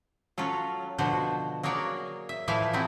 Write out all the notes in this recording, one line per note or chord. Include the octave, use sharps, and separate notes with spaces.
F#3 C#4 F4 A4
B2 D3 F3 F#4 C5
F#3 A#3 G#4 C#5 D5
E5
A2 E3 F3 E4 E5 F5
C3 F#3 C4 E4 G#4